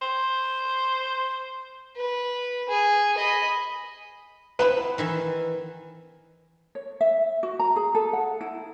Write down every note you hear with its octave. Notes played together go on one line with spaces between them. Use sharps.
C5
B4
G#4
D#5 B5
B3 C4 E4 B4
D#3 E3 E5
C#5
E5
F#4
A#5
G#4
A4
F#5
E4